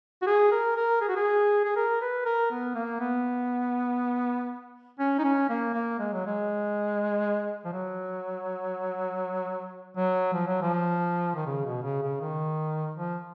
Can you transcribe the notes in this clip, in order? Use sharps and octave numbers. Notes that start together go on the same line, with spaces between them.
F#4
G#4
A#4
A#4
G#4
F#4
G#4
G#4
A#4
B4
A#4
B3
A#3
B3
C#4
D#4
C#4
A#3
A#3
G#3
F#3
G#3
F3
F#3
F#3
F3
F#3
F3
D#3
C#3
B2
C#3
C#3
D#3
F3